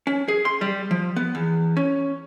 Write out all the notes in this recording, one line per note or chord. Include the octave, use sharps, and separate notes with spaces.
C#4
G#4
C6
G3
F3
B3
E2
C#4